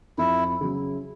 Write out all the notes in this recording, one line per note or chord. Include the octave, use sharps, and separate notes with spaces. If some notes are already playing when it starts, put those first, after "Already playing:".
F2 E4
C#3 F#3